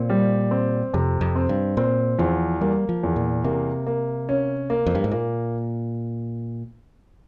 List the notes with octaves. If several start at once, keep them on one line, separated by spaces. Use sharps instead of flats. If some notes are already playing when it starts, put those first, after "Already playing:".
Already playing: A#2 C4
G3
C4
F2 C3
F2
C4
G2
A#2 C4
E2 F3
G3 A#3
F3
E2
A#2
C3 A#3
A#3
C#4
A#3
F2
G2
G#2
A#2 A#3